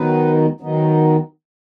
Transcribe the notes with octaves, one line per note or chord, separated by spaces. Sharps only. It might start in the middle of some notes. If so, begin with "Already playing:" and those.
Already playing: D#3 F#3 B3 D#4 B4
D#3 F#3 B3 D#4